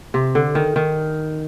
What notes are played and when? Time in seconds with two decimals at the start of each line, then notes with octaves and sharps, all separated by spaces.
0.14 C3
0.35 D3
0.55 D#3
0.76 D#3